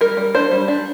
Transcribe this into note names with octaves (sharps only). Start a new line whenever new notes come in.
G3 A#4
G3
D4 C5
G3
D4